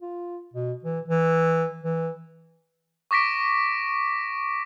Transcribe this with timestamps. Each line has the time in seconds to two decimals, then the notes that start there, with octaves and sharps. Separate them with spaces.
0.01 F4
0.53 B2
0.84 E3
1.08 E3
1.84 E3
3.11 C#6 D6 A#6 B6 D7